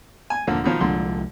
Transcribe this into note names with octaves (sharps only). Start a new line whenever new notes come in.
G#5
D#1 D3 F3 A#3
B2 D#3 F3
C2 A#2 D3 F3 G#3 C6